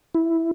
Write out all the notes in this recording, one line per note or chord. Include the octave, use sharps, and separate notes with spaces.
E4